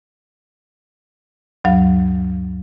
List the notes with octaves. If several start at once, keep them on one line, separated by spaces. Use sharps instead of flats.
D2 G2 F#3 F5